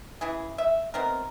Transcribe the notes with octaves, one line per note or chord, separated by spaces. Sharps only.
C#3 E3 E4 G#4
E5
B3 C4 D#4 A#4